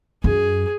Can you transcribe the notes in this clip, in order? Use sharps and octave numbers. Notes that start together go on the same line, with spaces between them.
F#2 G#4